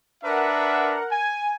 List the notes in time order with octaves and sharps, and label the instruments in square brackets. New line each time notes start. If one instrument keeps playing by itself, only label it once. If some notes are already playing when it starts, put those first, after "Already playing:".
[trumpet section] D4 B4 E5 [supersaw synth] A#4 F#5
[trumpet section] G#5